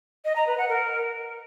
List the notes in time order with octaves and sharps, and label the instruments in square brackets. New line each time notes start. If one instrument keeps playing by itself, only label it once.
[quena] D#5
A#5
B4
F#5
A#4